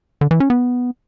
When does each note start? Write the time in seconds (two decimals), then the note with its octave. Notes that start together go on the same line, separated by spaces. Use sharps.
0.21 D3
0.31 E3
0.40 C#4
0.50 B3